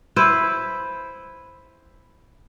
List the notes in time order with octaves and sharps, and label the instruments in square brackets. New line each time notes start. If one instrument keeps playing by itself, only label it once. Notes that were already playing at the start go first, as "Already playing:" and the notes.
[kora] E4 B4 C5